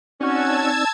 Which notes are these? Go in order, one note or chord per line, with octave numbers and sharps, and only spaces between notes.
C4 C#4 D#4 F#4 D5 A5 E6 G#6